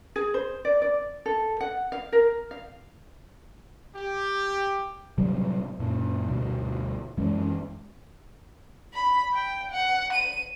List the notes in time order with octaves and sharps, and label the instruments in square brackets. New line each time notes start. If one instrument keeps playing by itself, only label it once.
[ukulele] G#4
C5
D5
D5
A4
F#5
F5
A#4
F5
[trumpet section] G4
[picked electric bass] A2 C3 F#3 G3
F#2 A#2
D2 G2 B2
F#2 E3 G#3 C#4
[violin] B5
G5
F#5
D#7